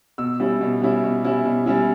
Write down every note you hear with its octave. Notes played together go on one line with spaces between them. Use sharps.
B2 E6
G3 C#4 E4
B2
G3 C#4 E4
B2
G3 C#4 E4
B2
G3 C#4 E4